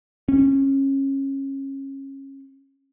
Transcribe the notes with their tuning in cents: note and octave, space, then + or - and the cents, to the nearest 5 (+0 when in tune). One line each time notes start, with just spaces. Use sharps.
C#4 -25